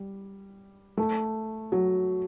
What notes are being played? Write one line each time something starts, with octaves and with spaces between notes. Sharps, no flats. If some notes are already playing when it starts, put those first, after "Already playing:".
Already playing: G3
A3
F#3